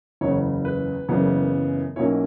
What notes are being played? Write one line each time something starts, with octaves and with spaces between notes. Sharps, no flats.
F#1 E2 C#3 C#5
B4
F#1 F#2 C#3 E3 B3
B1 B2 A#3 C#4 E4 C#5